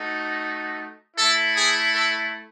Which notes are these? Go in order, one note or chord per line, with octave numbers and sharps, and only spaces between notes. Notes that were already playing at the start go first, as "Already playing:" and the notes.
Already playing: A3 D#4 F#4
A3 E4 A4
G#4
A4